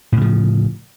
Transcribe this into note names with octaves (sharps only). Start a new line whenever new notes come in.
A2 C#3 F3